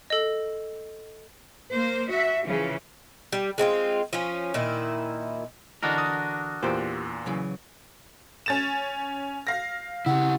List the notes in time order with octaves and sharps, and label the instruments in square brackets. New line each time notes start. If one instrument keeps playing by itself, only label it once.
[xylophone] A4 D#5
[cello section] A#3 C5
F#4 E5
C#3 E3 F3
[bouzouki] G3
G#3 C4 E4 F4
F3 C#4
A#2 D#3 E4
[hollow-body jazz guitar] D3 E3 D#5 [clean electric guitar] D4 F#4 A#4
[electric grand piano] D#6
[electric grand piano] E2 A#2 [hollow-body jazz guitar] G4 C5
[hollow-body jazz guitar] C#3 E3 F#3
[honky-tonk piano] C#4 A6 E7
F5 A#6
[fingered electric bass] C#3 [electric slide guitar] E4 G4 [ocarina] F#5